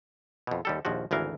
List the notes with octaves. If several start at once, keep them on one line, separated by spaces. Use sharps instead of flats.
F2 B2
D#2 G3 A4
A#1 D#2 F3 F#4
G#1 D2 E3 A#4 F5